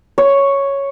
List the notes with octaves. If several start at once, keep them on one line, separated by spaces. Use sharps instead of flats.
C#5